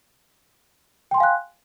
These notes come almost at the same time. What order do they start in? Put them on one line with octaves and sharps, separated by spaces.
G5 C6 G#5 F5 F#6